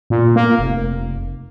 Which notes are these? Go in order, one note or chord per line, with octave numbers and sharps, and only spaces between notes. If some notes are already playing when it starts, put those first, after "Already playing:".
A#2
A#3
F1